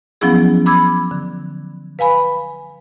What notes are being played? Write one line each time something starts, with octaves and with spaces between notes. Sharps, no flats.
F3 F#3 B3 C#4 E4 G#4
B5 D6 E6 G#6
D3
B4 F5 G#5 B5